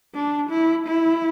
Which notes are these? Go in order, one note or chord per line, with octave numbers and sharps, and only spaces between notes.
D4
E4
E4